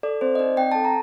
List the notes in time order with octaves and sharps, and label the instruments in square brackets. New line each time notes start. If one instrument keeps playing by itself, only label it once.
[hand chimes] A4 D5
C4 C5
D#5
D#4 D5
C4 G5
A4 A5
A#5